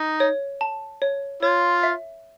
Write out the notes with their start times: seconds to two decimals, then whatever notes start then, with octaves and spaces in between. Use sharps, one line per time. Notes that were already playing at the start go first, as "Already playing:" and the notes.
Already playing: D#4
0.20 C#5
0.61 A5
1.02 C#5
1.43 F4 C#5
1.83 E5